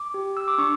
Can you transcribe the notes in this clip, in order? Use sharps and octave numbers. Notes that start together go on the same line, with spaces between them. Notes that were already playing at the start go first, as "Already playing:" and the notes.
Already playing: D6
G4
E6
D6
D4 C#6